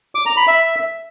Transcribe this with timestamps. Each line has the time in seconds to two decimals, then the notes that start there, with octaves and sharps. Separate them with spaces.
0.15 D6
0.26 A#5
0.37 B5
0.47 E5